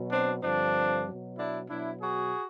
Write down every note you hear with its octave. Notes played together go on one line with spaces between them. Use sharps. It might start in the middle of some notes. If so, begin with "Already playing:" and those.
Already playing: B2 F#3
C4 D4
G2 D3 F3 C4 D4
B2 F#3
D4 E4
B2 F#3 D4 E4
F#4 G#4